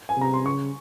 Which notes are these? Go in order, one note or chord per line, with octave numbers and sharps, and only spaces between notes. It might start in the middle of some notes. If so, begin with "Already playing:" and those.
G#5
C3 A#5
C6
C#3 C#6